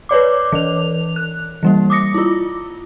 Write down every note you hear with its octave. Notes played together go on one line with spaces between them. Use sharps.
B4 C#5 D5 D6
E3 F7
F#6
E3 G3 A#3
D6 D#6 A#6 C#7
E4 F4